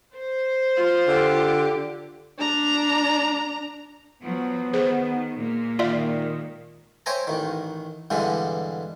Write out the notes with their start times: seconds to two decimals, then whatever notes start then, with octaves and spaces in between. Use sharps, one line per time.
0.15 C5
0.77 F4
1.08 D3 G4
2.38 D4 A#5
4.23 F3 F#3 B3
4.73 D#3 G#4 C5
5.38 A#2 G#3 A#3
5.79 D#3 F4 D5 E5 F5
7.06 C5 C#5 E5 G5 G#5 A#5
7.27 A1 D#3
8.11 G2 B2 D3 E3 G#3